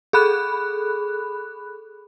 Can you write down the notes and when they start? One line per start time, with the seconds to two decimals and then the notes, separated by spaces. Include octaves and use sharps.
0.13 G#4 A4 B5 F#6